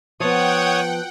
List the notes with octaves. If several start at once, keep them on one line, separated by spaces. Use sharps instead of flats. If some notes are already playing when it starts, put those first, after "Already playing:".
F3 B3 C#5 F#5 G5 D#6